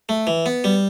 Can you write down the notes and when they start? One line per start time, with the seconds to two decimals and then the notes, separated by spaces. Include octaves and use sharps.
0.09 A3
0.27 E3
0.46 B3
0.64 G3